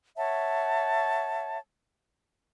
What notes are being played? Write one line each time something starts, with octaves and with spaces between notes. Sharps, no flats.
C#5 E5 F#5 A5